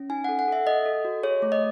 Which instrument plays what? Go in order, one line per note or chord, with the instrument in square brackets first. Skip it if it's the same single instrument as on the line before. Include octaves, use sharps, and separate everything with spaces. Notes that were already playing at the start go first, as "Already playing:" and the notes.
Already playing: [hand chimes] C#4
D#4 G#5
A4 F#5
F#5
A4 E5
A4 D#5
A4
F#4
G#4 C#5
A3
D#5